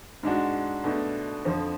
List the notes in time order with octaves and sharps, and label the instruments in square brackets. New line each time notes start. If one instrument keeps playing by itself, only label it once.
[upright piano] G#2 G#3 D4 F#4
B2 A3 D4
F2 D3 F3